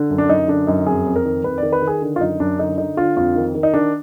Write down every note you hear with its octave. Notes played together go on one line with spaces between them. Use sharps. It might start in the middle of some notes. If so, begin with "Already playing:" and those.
Already playing: D3
F#2
D4
F#2 D#4
D3 D4
F#2 D#4
F2 G#4
F2
A#4
D#3
F2 B4
D#3 D5
B4
D#3
G#4
D3
F4
F#2 D#4
F#2 D4
D3 D#4
D3 D#4
D3 F4
F2 F4
D#3
D#3
D#4
D#3 D4